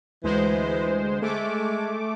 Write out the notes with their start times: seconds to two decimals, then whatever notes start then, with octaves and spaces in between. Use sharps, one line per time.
0.23 D2 E3 G#3 C5
1.22 G#3 A3 D6